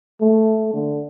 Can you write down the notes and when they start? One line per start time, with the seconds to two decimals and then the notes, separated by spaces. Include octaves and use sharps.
0.21 A3
0.73 D3